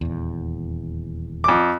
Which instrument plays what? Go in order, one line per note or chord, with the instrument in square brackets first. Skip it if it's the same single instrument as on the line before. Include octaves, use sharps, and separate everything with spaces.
[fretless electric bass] D#1 E2
[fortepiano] F2 D6